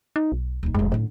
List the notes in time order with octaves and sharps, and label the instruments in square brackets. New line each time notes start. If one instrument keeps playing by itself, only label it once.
[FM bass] D#4
B1
[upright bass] D1 D#4
[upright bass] F1 A#1 [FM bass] G#3
[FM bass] A2 [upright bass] D3 C#4